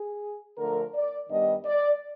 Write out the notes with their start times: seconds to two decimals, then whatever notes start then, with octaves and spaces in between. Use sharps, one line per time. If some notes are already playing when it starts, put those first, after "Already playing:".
Already playing: G#4
0.58 D3 F3 A3 A#4
0.94 D5
1.29 G2 D#3 G3 B3 D4 D#5
1.65 D5